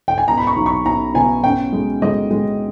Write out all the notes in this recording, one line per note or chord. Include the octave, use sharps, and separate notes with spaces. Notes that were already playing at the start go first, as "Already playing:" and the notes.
G5
G#5
B2 A#5
B5
C#6
B1
C#6
B1 A#5
B2 G#5
C#4 G5
G#3
G#3 D#5
G#3